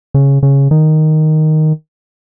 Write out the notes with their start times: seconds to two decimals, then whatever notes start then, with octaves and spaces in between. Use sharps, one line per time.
0.14 C#3
0.43 C#3
0.71 D#3